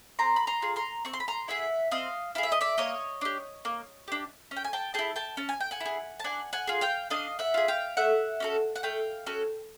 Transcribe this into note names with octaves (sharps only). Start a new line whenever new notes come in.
C4 A#5 C6
B5
A#5 C6
F4 G#4
A#5 C6
C4 C#6
C6
B5
A#5 C6
E4 G#4 E5 F#5
C4 D#5 F5
E4 G#4 F5
E5
D#5
D5 E5
A#3 C#5 D#5
D4 G4
A#3
D4 G4
C#4
G5
G#5
G5 A5
E4 G#4 G5 A5
G5 A5
C#4 A5
G#5
G5
F#5 G#5
E4
G#4
A5
D4 F#5 G#5
F#5 G#5
F4 G#4
F5 G5
D4 D#5 F5
E5 F#5
F4 G#4
F5 G5
A3 E5 F#5
C#4 F#4 A4
F#5
A3 F5 G5
C#4 F#4 A4